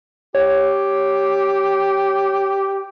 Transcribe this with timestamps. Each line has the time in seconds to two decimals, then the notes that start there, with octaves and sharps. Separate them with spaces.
0.35 G4 C#5